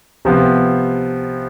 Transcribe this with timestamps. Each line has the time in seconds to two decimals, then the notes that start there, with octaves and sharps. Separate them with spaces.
0.25 C3 F3 B3